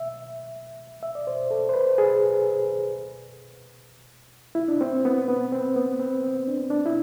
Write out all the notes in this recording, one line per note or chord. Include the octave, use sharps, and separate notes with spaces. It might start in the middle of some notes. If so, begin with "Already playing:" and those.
Already playing: E5
E5
D5
C5
A4
C5
B4
G#4
E4
D4
C4
B3
B3
C4
B3
C4
C4
D4
D4
E4